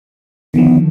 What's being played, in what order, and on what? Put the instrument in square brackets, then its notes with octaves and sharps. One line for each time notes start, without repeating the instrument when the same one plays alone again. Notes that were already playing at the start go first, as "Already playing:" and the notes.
[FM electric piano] D3 D#3 F3 [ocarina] B3